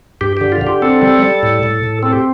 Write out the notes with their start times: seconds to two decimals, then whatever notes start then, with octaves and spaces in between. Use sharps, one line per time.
0.21 G2 G4
0.37 D3 G4
0.52 F4
0.61 D3
0.67 G4
0.82 C4 A4
1.02 G3
1.22 G3
1.43 A2
1.63 A2
1.84 A2
2.03 C4 A4
2.13 G4